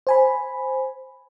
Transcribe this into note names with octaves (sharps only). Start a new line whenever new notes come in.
C5 G#5 B5